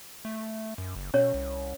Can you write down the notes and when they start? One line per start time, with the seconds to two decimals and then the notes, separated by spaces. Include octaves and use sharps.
0.25 A3
0.78 F#2
0.96 F#1
1.14 B2 C#4 C#5
1.34 C2